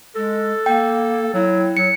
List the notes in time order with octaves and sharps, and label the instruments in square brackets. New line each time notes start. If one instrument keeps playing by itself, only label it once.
[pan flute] G#3 [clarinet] A4
[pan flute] A#3 [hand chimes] G5
[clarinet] F#3 [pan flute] E4
[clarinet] F#3 [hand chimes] C#7